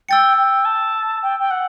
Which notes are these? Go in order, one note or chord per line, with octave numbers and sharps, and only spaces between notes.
G5 E6 A6 C#7
G5
A5
G5
G5
F#5